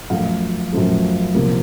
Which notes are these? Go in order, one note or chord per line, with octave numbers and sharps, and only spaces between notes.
F#2 F3 A3 F5
F#2 F3 A3
C2 C3 F3 A#3